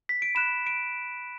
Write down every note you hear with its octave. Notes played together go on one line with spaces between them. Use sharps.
B6
D7
B5 F#6 E7
D7